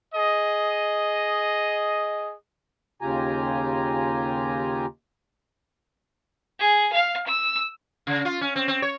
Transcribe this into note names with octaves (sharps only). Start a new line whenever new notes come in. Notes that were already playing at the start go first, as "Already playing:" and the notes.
G#4 D#5
D#2 C#3 F4 G4 G#5 A#5
G#4
F5
E6
C#3
F4
C#4
C4
C4
C#5